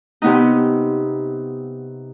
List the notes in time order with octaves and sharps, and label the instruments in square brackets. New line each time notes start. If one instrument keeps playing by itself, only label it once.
[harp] C3 B3 D#4